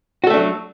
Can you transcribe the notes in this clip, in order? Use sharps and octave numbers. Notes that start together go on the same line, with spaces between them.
F#3 A3 D4 F#4 A4